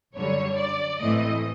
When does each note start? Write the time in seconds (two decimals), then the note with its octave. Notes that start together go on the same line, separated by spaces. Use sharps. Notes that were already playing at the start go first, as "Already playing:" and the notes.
0.15 F#2 D3 G3 C#5
0.58 D5
1.00 A1 A2 E3 A3 C4 D#5